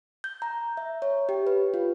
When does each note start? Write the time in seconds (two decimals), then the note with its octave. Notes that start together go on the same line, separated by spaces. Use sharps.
0.24 G6
0.42 A#5
0.77 E5
1.02 C#5
1.29 G4
1.47 B4
1.74 F4